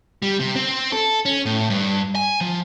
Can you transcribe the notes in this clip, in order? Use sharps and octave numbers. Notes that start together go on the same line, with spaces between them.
G3
C3
C4
A4
C#4
A2
G2
G#5
F3